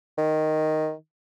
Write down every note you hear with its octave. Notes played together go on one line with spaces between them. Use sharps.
D#3